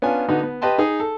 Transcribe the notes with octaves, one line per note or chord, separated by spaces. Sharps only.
B3 C#4 D4 F4 G#5
D3 B3 D#4 F#4
B3
G4 B4 D#5 G5 A5 C6
D#4 G#4
A4